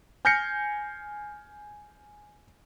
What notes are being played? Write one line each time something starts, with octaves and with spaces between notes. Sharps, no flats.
G#5 F6 G6 A#6 C7 C#7